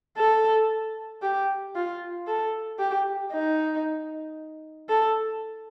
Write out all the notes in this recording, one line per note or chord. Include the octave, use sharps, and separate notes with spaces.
A4
G4
F4
A4
G4
D#4
A4